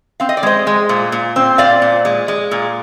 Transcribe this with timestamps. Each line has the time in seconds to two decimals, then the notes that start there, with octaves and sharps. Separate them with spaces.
0.20 C4 F5
0.29 D#5
0.37 D5
0.43 G#3 C5 D#5
0.67 G#3
0.89 A#2
1.12 A#2
1.36 C4
1.58 A#2 D5 F5
1.82 A#2
2.05 G#3
2.28 G#3
2.51 A#2